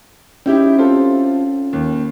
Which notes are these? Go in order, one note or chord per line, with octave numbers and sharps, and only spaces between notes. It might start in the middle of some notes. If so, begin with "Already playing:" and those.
C#4 D#4 E4 G4
C4 F4 A4
D#2